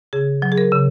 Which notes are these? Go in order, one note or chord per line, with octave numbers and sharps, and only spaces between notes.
C#3 G#4
F#3
G#4
A#4
C#3